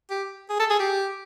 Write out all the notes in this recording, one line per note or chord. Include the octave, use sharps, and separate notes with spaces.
G4
G#4
A4
G#4
G4